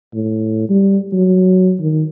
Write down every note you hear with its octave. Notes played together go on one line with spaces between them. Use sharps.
A2
G3
F#3
D#3